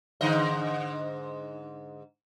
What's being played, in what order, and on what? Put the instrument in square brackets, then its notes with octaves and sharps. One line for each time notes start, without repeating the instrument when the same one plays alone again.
[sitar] G#2 D3 D#5